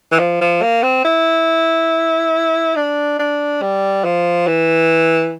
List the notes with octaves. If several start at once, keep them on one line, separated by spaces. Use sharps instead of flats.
E3
F3
F3
A#3
C4
E4
D4
D4
G3
F3
E3